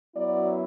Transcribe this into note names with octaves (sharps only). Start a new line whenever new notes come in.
F#2 F#3 B3 E4 D5